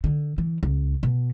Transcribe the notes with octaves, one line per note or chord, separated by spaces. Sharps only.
D3
E3
C#2
B2